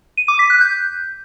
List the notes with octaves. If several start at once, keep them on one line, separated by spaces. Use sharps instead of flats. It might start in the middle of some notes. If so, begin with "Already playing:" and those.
D#7
D6
B6
F#6
G6